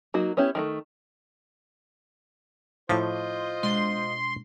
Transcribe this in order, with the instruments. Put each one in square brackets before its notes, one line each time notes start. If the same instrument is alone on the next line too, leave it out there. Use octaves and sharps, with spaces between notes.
[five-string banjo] F#3 A#3 D#4 F#4
B3 C#4 E4 G4
D#3 G3 A3
[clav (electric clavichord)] A2 F3 [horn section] F4 C5 D#5 [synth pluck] C#6 D6
[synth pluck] B2 G#3 D4 [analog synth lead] C6